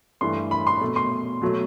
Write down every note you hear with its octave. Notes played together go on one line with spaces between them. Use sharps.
G2 E3 A3 C6
B5
C6
B2 A3
C6
B2 F#3 A3